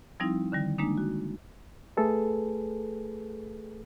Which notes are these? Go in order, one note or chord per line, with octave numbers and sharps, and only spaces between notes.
F3 G3 C4 D#4 E4
D3 D#3 G3
G#3 A#3 D4 D#4
F#4
A3 G#4 A4 B4